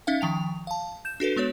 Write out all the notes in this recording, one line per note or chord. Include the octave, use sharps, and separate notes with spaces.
C#4 D#4 E5 F5
D#3 F3 G5 F7
F5 A5
G6 E7
D4 F#4 A4 B4
G#3 B3 F#4 C#5